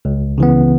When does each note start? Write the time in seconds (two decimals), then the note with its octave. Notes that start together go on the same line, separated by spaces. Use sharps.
0.05 C#2
0.38 C#3 E3 B3